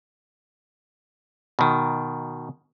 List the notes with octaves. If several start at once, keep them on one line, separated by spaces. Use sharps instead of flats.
B2 D#3